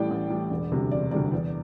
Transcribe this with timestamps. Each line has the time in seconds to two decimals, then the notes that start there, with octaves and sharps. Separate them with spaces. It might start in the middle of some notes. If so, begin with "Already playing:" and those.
Already playing: A1 A2 E3 G3 D5 G5
0.11 A1
0.30 A2 E3 G3
0.50 E1
0.71 D2 C3 G3
0.92 E1 D5
1.11 D2 C3 G3 D5
1.32 E2